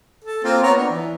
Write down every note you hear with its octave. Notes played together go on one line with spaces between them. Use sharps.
A4
A#3 C4 F4
B3 C#5 A#5
D4
E3